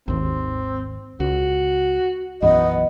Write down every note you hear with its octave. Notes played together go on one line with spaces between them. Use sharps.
G#1 D#2 C4
C#2 F#4
B1 F#2 E3 B3 D#5